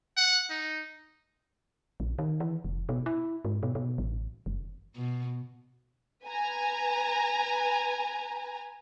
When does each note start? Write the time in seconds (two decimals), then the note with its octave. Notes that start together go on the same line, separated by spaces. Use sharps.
0.17 F#5
0.50 D#4
2.00 A#1
2.19 D#3
2.40 E3
2.65 F1
2.89 B2
3.06 E4
3.45 G#2
3.63 B2
3.75 B2
3.98 A1
4.46 F#1
4.95 B2
6.24 B4 G#5 A#5